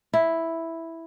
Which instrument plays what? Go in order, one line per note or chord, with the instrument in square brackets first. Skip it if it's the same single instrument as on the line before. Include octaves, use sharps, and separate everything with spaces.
[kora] E4